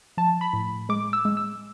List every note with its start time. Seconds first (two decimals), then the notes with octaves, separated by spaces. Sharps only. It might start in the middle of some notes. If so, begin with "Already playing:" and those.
0.17 F3 A5
0.41 B5
0.53 A2
0.89 G#3 D6
1.13 E6
1.25 G#3
1.37 E6